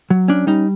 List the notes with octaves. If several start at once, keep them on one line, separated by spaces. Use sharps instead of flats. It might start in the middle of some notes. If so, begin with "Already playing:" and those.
F#3
C#4 D4
G3 D#4